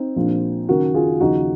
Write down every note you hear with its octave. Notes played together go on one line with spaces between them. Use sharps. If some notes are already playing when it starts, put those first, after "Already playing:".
Already playing: C4 D#4
A#1 A#2 F3
F#1 F#2 D#3 F#4 A#4
F4 G#4
D#2 C#3 F3 D#4 F#4